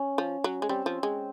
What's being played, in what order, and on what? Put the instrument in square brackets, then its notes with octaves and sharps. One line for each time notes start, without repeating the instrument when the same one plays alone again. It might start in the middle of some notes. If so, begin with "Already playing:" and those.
Already playing: [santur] C#4
[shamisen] F3
F#3
G#3
[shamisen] G3 [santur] C4
[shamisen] F3
G#3